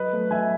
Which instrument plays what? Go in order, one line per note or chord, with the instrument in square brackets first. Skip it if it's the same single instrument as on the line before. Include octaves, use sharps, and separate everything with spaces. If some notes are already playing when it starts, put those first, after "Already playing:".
Already playing: [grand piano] F#3 B4 D#5
A3
F#3 E5 G#5